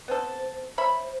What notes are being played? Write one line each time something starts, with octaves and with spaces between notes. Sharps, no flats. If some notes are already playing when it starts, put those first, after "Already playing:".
B3 C4 A4 C5
C5 C#5 E5 B5